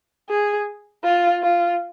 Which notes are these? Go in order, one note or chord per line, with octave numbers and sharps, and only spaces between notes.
G#4
F4
F4